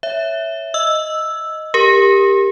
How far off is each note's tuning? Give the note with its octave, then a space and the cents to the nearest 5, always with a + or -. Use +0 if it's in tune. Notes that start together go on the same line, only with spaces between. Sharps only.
C#5 +0 E5 +0
D#5 +0 E6 +0
G4 +10 A#4 +0